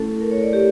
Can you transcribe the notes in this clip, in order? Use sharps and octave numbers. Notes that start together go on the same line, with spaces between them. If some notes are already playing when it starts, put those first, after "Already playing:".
Already playing: A3 C#4 E4 A4
A#4
C#5
D5
G4